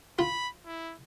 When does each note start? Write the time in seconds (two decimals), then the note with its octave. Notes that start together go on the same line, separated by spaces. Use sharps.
0.19 F4 B5
0.66 E4